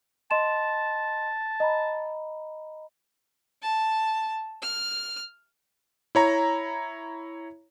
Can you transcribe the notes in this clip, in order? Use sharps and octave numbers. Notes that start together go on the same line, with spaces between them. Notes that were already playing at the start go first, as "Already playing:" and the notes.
D#5 A5 C6 E7
D#5 A#5 B5
A5
F6
E4 C#5 A#5